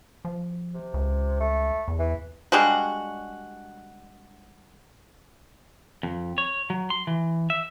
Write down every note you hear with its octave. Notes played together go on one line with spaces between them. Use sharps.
F3
C3
C#2
A3
E2
E3
G3 G#3 D4 F#4
F2
C#5
F#3
C6
E3
E5